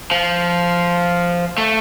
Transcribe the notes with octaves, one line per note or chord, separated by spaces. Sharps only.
F3
A3